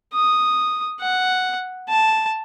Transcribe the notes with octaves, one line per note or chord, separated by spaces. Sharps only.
D#6
F#5
A5